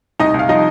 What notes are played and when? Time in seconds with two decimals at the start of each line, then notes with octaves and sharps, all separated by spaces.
0.19 C2 D#4 D#5
0.34 C2
0.39 F5
0.49 F3 D#4 D#5